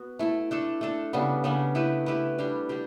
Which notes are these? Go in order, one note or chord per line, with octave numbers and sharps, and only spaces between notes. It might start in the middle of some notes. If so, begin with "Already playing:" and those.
Already playing: B3 F#4
A3 E4 A4
A3 D4 A4
A3 D4 A4
C#3 G3 B3 D4
C#3 G3 B3 D4
A3 E4 G4 B4
A3 E4 G4 B4
G3 D4 G4
G3 D4 G4